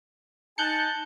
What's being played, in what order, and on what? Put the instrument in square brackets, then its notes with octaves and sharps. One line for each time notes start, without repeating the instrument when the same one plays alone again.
[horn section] D#4 G#5 A5 [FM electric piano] F#6 G6 C#7